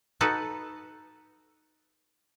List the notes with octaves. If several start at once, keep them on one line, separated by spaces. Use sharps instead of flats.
D#4 F#4 A4 B4